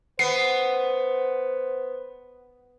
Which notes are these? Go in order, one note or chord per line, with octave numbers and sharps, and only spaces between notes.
B3 C5 C7